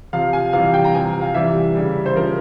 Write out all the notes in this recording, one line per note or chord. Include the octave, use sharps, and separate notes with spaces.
C3 F3 F5
G#5
C3 E3 G3 F5
G5
A#5
C3 F3 G#5
F5
C3 E3 G3 E5
C#3 G3
C5
C#3 F3 A#4